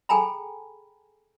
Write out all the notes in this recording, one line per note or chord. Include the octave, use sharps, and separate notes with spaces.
G#4 A4 G5 G#5 A#5 B5